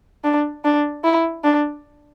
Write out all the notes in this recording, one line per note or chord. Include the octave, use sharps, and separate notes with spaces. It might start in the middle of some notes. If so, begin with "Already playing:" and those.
D4
D4
E4
D4